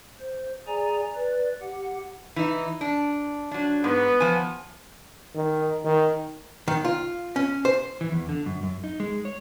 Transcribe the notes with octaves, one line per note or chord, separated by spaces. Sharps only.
C5
G#4 D5 G#5 A#5
B4 D5
G4 F#5
E3 D#4
D4
F#3 D4
G#2 B3
F3 G#5
D#3
D#3
D#3
F4
C#4
C5
E3
E2
D3
F#2
F#2
D#4
G#3
C#5